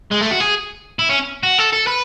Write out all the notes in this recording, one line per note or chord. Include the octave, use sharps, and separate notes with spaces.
G#3
A3
F#4
G#4
E4
C#4
F#4
A4
A4
B4